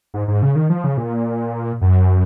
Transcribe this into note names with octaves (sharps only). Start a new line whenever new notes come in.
G#2
G#2
C#3
D#3
F3
C#3
A#2
F#2